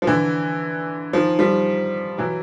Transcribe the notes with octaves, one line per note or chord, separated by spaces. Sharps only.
F3
D3 E3
D#3 F3
F3 G3
E3 F#3